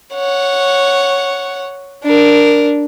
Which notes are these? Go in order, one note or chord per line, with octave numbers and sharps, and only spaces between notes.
C#5 F#5
D4 A#4